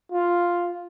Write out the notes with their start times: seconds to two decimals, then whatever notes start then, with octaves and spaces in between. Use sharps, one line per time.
0.12 F4